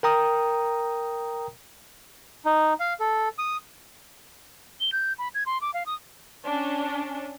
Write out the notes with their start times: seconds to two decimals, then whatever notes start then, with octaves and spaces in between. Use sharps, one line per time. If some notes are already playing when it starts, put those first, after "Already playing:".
0.03 A#4 G5 A#5 D#6
2.45 D#4
2.80 F5
3.00 A4
3.38 D#6
4.80 G7
4.92 G6
5.18 B5
5.34 G#6
5.46 C6
5.61 D6
5.74 F5
5.86 D#6
6.45 C#4 D4